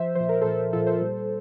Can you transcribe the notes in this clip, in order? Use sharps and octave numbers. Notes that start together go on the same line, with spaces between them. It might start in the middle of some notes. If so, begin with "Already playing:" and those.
Already playing: F3 C5 E5
A#2 F3 C5
A#4
A#2 F3 A4 C5
A#2 F3 F4 A4
A4 C5
A#2 G3